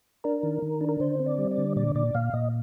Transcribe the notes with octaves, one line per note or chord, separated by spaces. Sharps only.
D4 A#4
D#3
D#3
D4
A#4
D3 C5
C4
D5
G3
D5
D3
A#2 D5
A#2 D5
A#2 F5
A#2 D#5